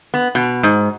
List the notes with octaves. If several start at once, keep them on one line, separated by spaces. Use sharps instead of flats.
B3
B2
G#2